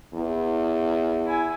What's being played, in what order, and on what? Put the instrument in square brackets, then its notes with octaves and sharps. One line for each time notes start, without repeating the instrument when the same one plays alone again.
[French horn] E2
[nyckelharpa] E4 G#5